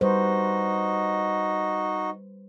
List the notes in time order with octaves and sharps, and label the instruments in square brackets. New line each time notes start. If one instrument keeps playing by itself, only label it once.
[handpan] G3 B4 C5 [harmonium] D#4 F#4 D#5